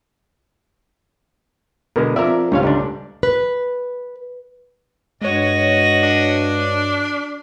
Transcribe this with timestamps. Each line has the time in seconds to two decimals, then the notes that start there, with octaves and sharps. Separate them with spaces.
1.96 B2 D3 G#3 A#4
2.16 F2 A#4 D5 E5
2.52 C#2 G#2 G3 C#5 F5
2.63 C#2 D3 D4
3.23 B4
5.22 G2 G#3 F#4 C#5 D#5
6.03 D4